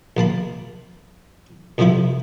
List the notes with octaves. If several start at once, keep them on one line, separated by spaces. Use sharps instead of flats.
A#1 A#3 A5 B5
C2 F2 D3 F3 E4 B5